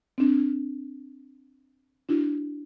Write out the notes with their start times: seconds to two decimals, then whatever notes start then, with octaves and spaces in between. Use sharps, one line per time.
0.18 C4 D4
2.09 D4 E4 F#4